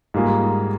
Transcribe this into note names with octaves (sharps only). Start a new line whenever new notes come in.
G#2 G3 A#3 F4 G#4